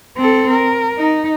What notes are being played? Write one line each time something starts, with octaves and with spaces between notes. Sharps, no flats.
C4 A4
A#4
D#4